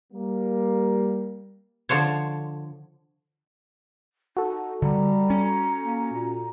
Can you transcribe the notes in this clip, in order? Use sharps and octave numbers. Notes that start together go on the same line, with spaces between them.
G3 A#3
D3 F3 C5 C#5
D#4 F#4 A4
D3 G3 A#5
C#4
A#3
A#2